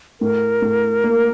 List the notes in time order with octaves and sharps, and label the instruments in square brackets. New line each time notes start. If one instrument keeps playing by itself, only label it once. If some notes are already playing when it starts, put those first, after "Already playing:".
[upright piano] A2 [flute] A#4
[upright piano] A2
A#3